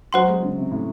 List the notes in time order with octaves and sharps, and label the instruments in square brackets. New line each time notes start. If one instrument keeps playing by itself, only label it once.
[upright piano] F#3 [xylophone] C5 F#5 C6
[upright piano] G#3
C#3
C3
A2